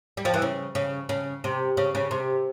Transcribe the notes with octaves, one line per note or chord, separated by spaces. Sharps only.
G3
F3
E3
C#3
C#3
C#3
C3
C#3
C#3
C3